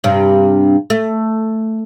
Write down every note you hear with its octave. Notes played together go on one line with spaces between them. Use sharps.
G2 C3
A3